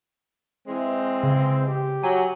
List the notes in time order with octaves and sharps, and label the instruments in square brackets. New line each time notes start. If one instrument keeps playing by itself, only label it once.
[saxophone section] E3 G#3 [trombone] C4
[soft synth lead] C#3
[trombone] G4
[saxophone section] F#3 [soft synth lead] G#5